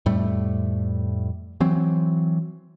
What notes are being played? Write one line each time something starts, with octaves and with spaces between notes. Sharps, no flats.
F2 A2 G3 A3
E3 F#3 C4